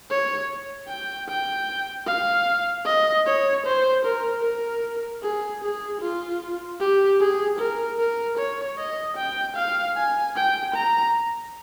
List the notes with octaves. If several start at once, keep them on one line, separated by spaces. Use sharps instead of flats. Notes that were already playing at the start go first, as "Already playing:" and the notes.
C#5
G5
G5
F5
D#5
C#5
C5
A#4
A#4
G#4
G#4
F4
G4
G#4
A#4
A#4
C#5
D#5
G5
F5
G#5
G5
A#5